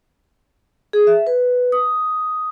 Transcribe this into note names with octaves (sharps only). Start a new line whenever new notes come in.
G#4
E5
B4
D#6